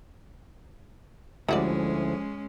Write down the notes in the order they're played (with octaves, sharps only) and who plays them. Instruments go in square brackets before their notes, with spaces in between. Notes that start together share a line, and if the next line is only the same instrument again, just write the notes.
[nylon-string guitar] D2 E4 [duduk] F3 [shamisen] G3 F#4 D5 [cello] G#3 C#4